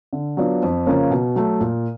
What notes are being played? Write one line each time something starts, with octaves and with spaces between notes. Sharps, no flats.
D3
F#3 B3 D4 F4
F2
C#3 F3 A#3 C#4
B2
F#3 A3
A#2